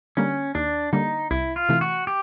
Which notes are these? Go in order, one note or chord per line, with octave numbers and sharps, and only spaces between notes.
D3 G3 A#3 C#4
D#2 D4
D3 G3 A#3 D#4
C2 E4
F4
C3 E3 A3
F#4
G4